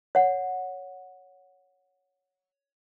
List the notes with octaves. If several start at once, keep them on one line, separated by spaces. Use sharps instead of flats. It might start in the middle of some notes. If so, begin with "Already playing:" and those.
C#5 F#5